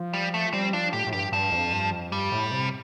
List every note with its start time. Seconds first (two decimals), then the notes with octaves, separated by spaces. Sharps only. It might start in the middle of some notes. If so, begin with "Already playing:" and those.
Already playing: F3
0.13 G3
0.34 A3
0.53 G3 C4
0.73 F3 D4
0.93 A2 G4
1.07 A2
1.13 G2 G4
1.32 G2 F3
1.52 F2
1.73 G2
1.92 F2
2.12 G2 G3
2.32 A2
2.51 C3